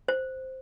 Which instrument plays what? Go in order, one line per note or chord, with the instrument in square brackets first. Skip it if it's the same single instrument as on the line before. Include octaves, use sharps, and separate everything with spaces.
[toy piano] C5